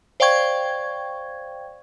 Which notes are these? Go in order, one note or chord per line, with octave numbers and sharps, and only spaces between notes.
C5 D5 F5 G5 C#6 G#6